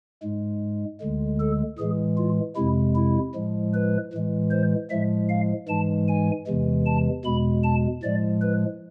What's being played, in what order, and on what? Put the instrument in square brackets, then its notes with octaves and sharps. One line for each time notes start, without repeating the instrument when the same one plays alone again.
[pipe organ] G#2 G#3
D2 D3 G#3
A4
A2 E3 G#3 G#4
F4
F2 C3 G#3 E4
E4
A2 F3 G#3
B4
A2 E3 G#3
C5
A2 F3 G#3 E5
F5
G#2 E3 G#3 A5
G#5
E2 C3 E3 G#3
A5
E2 B2 G#3 B5
A5
A2 F3 G#3 D5
B4